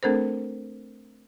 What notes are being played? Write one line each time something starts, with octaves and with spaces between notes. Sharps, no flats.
A3 C4 D4 A4 A#4 C5